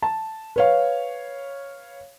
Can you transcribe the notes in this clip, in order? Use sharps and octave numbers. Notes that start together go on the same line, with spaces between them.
A5
B4 C#5 F5